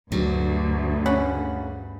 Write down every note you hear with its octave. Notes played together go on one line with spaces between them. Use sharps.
D2 G2 F#3
C#3 C#4 F#5 B5